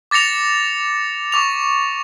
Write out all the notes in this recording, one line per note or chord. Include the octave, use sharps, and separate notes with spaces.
D6 A6 A#6 C#7 F7
C#6 D6 F7